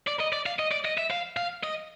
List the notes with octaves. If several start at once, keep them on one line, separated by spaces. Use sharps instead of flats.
D5
D#5
D5
F5
D#5
D5
D#5
E5
F5
F5
D#5